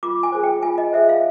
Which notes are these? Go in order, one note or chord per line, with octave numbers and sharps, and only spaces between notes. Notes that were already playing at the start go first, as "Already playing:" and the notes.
F4 D6
G#5
G#4 C5
G5
F4 G#5
D#5
G#4 C5 E5
F5